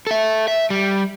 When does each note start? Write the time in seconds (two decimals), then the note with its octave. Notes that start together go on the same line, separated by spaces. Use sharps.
0.07 A4 E5
0.48 E5
0.70 G3